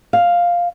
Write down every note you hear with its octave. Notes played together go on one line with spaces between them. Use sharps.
F5